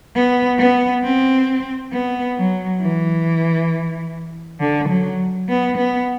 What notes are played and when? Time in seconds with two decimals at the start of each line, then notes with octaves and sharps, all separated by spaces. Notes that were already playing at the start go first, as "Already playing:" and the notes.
0.16 B3
0.59 B3
1.03 C4
1.93 B3
2.37 F#3
2.81 E3
4.60 D3
4.89 F#3
5.49 B3
5.77 B3